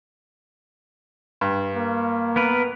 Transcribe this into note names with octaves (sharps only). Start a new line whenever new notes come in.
G2
A#3
B3 A#4 B4